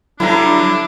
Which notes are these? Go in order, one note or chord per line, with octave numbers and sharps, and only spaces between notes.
D3 F#3 G3 D4 E4 A#5